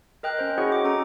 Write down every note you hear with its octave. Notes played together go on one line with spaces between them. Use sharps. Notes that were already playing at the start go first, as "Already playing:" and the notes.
A#4 D#5 G5 F#6
C#4 C5 G6
E4 F#4 G#4 C#5 D#5 F#5
G5 D6
C#4 A4 A#5 D6